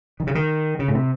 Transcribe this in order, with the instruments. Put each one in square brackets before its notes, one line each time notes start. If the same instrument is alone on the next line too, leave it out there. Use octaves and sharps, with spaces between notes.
[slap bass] D#3
C#3
D#3
C#3
A2
C3